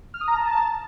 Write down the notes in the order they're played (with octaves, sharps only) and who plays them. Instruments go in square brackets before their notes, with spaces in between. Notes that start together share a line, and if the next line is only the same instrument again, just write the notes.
[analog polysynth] F6
D#6
A#5
A5